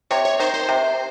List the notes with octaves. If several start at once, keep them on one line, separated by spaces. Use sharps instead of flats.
C3 C#5
C#5
D#3 C5
C5
C3